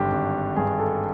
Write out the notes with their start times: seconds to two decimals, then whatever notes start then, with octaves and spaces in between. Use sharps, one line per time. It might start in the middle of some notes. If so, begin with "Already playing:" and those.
Already playing: G#1 G2 D3 G4
0.12 G#1
0.56 G2 G#4
0.79 A4